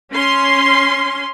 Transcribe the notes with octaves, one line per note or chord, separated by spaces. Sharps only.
C#4 C6